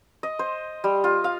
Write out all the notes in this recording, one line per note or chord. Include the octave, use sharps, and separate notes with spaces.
D#5
C5
G3
F4
F5